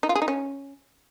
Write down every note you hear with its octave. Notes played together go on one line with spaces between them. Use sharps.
D#4
F4
G#4
D#4
C#4